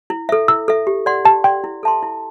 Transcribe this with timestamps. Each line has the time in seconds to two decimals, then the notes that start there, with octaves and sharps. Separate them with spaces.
0.10 E4
0.29 A4 E5
0.48 E4 E6
0.68 A4 E5
0.87 G4
1.06 D5 F#5 C6
1.25 G4 A5
1.44 D5 F#5 G5 C6
1.64 E4
1.83 A4 E5 A5 C6
2.02 E4